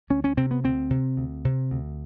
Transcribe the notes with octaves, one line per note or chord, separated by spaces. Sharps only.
D2 C#4
C#4
C3 C4
B3
D2 C4
C3
D2
C3
D2